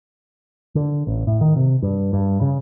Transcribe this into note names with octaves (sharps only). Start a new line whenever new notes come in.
D3
A1
A2
D#3
C3
G2
G2
C#3